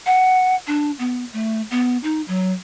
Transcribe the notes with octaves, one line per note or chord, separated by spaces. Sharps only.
F#5
D4
B3
A3
B3
D#4
F#3